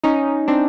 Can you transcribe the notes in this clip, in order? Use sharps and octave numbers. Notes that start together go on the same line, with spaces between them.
C#4 D#4
C4 D4